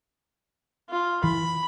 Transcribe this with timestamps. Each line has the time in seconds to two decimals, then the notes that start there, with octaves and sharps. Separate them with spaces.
0.90 F4
1.24 E3 B5